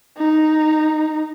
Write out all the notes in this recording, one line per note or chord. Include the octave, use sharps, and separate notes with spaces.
D#4